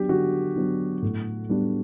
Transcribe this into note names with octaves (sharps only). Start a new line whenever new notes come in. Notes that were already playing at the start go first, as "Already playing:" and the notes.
Already playing: F#3 B3 D4 G4
D3 F#4
F#3 B3 D4
A2
G3 B3 D4